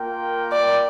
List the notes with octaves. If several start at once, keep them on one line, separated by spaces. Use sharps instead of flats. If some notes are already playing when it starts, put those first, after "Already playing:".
Already playing: A#3 F4 A#4 G5
D5